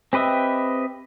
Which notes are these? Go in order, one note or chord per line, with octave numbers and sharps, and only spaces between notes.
C4 G4 B4 D#5 E5